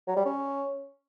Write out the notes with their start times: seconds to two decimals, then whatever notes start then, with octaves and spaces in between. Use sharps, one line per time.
0.08 F#3
0.16 G3
0.25 C#4